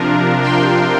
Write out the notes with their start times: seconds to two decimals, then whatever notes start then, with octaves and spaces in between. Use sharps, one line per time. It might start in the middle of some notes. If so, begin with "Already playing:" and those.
Already playing: C3 F3 D4 F4 A#4
0.42 G5 C6